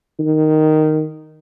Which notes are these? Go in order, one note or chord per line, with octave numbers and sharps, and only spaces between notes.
D#3